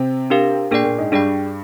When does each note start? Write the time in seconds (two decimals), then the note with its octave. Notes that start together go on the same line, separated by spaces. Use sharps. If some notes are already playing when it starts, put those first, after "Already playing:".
Already playing: C3 C4
0.30 D4 G4 A#4 F5
0.71 A#2 A#3 D4 G#4 D5 G5
0.84 A#2 A#3
0.98 G#2 G#3
1.12 G2 G3 D4 G#4 D5 G5